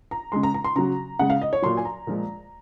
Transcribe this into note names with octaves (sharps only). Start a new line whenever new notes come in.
A#5
C#3 G#3 C6
A#5
A#5
C6
C#3 F#3 A#5
C#3 G#3 F#5
F5
D#5
C#5
A#2 F#3 C6
G#5
A#5
A#2 F3 G#3